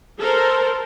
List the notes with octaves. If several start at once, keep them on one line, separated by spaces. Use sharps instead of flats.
A4 A#4 C5